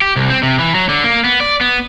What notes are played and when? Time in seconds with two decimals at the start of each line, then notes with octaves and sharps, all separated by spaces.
0.01 G4
0.16 C2
0.30 C4
0.43 C3
0.59 E3
0.75 F#3
0.89 D3
1.04 A#3
1.24 B3
1.40 D5
1.61 B3